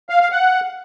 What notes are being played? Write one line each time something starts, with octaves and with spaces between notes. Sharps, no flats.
F5
F5
F#5